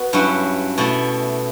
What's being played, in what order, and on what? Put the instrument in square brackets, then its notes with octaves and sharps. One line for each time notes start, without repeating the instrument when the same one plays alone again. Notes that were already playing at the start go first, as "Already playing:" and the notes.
Already playing: [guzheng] B3 F#4
G2 F#3 C#4 E4
B2 A3 E4